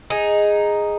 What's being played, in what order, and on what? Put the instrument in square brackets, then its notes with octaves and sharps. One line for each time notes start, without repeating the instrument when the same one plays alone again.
[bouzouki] D#4 G#4